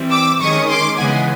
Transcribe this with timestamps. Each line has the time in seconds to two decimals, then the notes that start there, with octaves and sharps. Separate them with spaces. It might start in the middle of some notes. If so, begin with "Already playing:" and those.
Already playing: E3 G3 C4
0.11 D6 E6
0.40 D#3 G#3 C#4 C#6 D#6
0.68 C6 D6
0.97 C#3 E3 G#3 B3 F#5 G#5